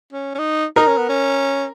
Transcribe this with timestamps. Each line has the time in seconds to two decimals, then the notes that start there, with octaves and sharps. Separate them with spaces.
0.13 C#4
0.35 C#4
0.39 D#4
0.76 D#4 A#4
0.87 C#4
0.98 B3
1.09 C#4